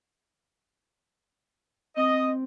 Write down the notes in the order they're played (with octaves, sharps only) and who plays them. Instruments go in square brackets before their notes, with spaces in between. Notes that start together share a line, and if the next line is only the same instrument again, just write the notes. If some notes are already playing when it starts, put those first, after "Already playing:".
[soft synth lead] C4 [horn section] D#5